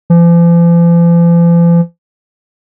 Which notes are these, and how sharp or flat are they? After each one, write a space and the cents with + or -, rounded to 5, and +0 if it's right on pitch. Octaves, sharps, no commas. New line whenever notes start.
F3 -45